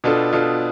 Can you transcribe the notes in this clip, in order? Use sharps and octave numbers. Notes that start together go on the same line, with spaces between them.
B2 B3 D4 F4 A4
B2 B3 D4 F4 A4